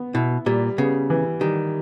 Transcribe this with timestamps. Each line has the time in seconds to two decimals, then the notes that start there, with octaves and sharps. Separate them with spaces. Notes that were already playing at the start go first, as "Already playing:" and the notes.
Already playing: B3
0.14 B2 E4
0.46 A#2 G3
0.78 C#3 B3
1.10 E3
1.41 D#3 G3